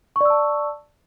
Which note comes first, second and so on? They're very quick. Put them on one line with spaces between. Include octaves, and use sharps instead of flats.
C#6 D5 E6 A5